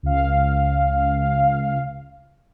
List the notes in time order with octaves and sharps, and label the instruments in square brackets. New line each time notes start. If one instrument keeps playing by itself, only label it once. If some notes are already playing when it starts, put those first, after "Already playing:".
[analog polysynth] C#2 F5